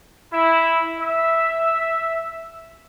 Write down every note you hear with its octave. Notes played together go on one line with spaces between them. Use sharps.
E4
E5